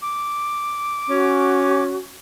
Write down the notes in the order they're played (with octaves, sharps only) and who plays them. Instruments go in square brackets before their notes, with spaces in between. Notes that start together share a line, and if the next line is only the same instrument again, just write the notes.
[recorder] D6
[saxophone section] C#4 [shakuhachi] F#4